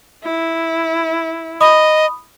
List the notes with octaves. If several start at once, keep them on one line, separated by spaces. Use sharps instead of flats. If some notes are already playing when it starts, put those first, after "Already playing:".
E4
D#5 B5 D#6